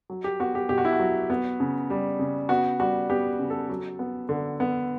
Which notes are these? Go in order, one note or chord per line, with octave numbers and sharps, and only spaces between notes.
F#3
G4
B3 F#4
G4
B2 G4
F#4
E4
F#4
F#3
B3
C#3
G3
C#3
B3 F#4
G3 F#4
B3 G4
C#3
A4
F#3
B3
D3
B3